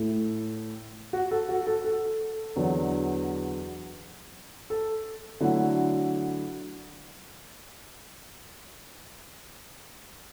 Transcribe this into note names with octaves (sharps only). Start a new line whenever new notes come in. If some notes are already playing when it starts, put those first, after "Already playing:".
Already playing: A2 A3 E4
F#4
A4
F#4
A4
A4
E2 D3 F#3 D4
A4
D3 F#3 A3 E4 F#4